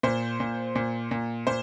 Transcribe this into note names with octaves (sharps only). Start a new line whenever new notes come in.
A#2 C5
A#2
A#2
A#2
A#2 C5